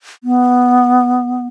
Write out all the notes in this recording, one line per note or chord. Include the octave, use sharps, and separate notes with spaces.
B3